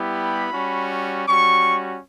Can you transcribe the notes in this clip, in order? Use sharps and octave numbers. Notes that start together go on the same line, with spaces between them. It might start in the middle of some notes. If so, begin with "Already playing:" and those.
Already playing: G3 B3 E4 G4
B5
G3 C#4 F#4
G3 C#4 F#4 C#6